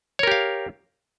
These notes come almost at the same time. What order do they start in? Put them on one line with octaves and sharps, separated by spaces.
C#5 A#4 G4 F5